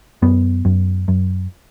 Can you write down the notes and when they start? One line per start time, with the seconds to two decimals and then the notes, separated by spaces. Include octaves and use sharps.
0.22 F#2 B3
0.65 F#2
1.08 F#2